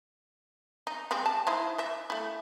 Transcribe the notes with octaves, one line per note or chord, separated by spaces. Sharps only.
D#4
G3 G#3 C4
A5
D#4 E4 C5
D#5 E5
A3 E4